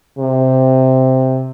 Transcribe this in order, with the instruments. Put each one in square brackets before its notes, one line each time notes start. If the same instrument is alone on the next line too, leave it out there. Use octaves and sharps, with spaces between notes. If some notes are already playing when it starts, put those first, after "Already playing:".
[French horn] C3